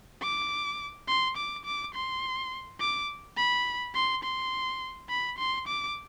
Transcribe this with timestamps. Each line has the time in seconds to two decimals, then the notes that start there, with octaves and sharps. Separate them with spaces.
0.22 D6
1.08 C6
1.37 D6
1.65 D6
1.94 C6
2.80 D6
3.37 B5
3.95 C6
4.24 C6
5.09 B5
5.38 C6
5.67 D6